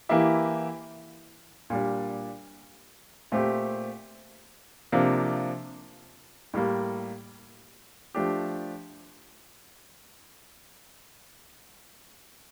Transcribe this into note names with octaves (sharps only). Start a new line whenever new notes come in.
E3 A#3 E4 G4
A#2 G3 D4
A#2 A3 C4 G4
C3 F3 A#3 D4
A2 G3 A#3
F3 A3 D4 G4